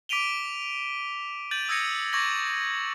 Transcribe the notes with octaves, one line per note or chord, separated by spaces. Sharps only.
D6 B6 D7 D#7 F7 G7
G6 A6 D#7 F#7
D#6 E6 G#6 A#6 C#7 D#7
C#6 D6 G#6 A#6 F#7